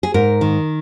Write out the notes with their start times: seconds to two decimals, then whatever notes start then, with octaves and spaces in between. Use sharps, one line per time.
0.03 G#4
0.14 G#2 A#4
0.41 D#3